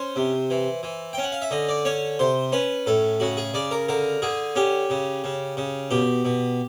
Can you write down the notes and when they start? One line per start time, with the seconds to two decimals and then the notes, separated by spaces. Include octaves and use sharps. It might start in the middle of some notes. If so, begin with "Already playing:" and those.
Already playing: C#4 C5
0.16 C3
0.50 E3
0.83 E3
1.13 G5
1.18 C#4
1.23 F#5
1.32 F5
1.42 E5
1.51 D3 D#5
1.69 D5
1.85 C#4 C#5
2.19 C3 C5
2.52 C#4 B4
2.87 A2 A4
3.20 C#3 F#4
3.37 G#4
3.54 C#3 D5
3.71 A#4
3.89 D3 A#4
4.22 D3 G#4
4.56 C#4 G4
4.90 C#3
5.24 C#3
5.57 C#3
5.91 B2 G4
6.25 B2